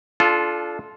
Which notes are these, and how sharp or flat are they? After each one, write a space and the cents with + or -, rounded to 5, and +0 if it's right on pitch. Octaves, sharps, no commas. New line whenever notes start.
D4 +0 F4 +0 A4 -25